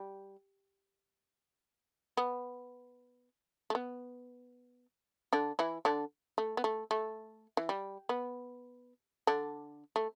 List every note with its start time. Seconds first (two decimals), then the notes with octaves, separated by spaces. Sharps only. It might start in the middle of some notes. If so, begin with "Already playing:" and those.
Already playing: G3
2.17 B3
3.70 A3
3.75 B3
5.33 D3 D4
5.59 E3 E4
5.85 D3 D4
6.38 A3
6.57 B3
6.64 A3
6.91 A3
7.57 E3
7.69 G3
8.09 B3
9.27 D3 D4
9.96 A3